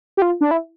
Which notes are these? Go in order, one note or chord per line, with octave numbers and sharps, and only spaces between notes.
G4
F4
D4
E4